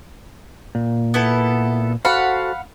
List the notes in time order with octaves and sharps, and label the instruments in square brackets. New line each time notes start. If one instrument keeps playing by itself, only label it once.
[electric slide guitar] A#2
[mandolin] B3 E4 A4
[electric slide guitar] F#4 A4 C5 [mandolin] F5 F#5 B5